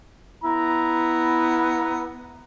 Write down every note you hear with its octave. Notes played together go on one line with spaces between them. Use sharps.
B3 E4 A#5